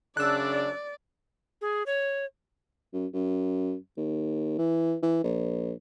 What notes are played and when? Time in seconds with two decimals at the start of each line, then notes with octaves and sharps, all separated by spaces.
0.17 F#2 C#3 D4 D5 E6 F#6
1.61 G#4
1.86 C#5
2.93 F#2
3.14 F#2
3.97 D#2
4.58 E3
5.03 E3
5.24 A#1